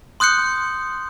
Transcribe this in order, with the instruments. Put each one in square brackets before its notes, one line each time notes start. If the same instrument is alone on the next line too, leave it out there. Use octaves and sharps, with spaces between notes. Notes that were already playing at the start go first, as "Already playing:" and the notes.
[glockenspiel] C6 D#6 F#6 G6 C#7